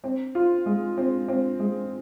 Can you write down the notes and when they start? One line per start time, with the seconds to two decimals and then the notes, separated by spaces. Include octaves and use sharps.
0.04 C4
0.35 F4
0.66 G#3
0.97 C4
1.28 C4
1.59 G#3